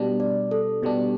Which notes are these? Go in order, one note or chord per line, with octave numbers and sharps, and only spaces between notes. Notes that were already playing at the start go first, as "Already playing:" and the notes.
Already playing: B2 G3 D4
D5
A4
B2 G3 D4 G4